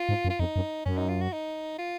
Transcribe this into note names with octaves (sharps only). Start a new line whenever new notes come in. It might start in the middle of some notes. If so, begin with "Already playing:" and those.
Already playing: F4
G#2
F#2
F4
F2 D#4
F#2
F#2 C#4
D#4
F4
F#4
D#4
F4